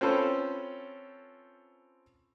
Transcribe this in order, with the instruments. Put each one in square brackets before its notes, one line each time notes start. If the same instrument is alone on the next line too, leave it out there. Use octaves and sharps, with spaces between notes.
[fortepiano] C4 C#4 F4 A4 B4 C5